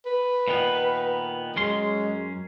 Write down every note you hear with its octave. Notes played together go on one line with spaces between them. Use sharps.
B4
A#2 D#3 B3
F#2 G#3 C#4 C6